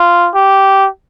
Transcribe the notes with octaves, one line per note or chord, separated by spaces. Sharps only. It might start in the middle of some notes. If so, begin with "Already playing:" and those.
Already playing: F4
G4